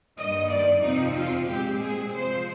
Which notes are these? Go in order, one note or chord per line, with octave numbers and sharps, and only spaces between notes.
G2 D#3 A#3 D#5
D5
F2 C3 F3 C4 D#4
F4
A#2 G#3 C4 G4
G#4
C3 F3 G#3 C5